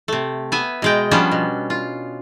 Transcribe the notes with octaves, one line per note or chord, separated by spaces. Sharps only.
C3 A3
B3 E5 G#5
B2 G#3 G5
F3 G3 B3 C#4 D4
B2
F4